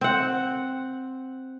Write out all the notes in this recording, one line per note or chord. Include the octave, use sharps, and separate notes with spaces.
C4 F#5